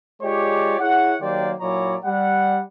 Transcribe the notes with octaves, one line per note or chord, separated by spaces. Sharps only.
G#3 F4 G4 C#5 D5
E4 G#4 C#5 F#5
D#3 F#3 A#3 G4 C5 D5
A#2 F#3 E4 C#5 D5 A#5
G3 F#5